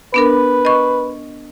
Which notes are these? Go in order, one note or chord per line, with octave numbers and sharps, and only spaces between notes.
B3 D4 A#4 B4
D#5 C#6